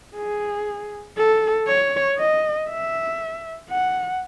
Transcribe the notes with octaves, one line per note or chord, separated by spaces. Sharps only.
G#4
A4
C#5
D#5
E5
F#5